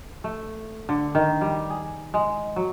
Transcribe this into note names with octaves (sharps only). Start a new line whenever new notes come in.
A3
D3
D#3
G3
G#4
G#3
F#3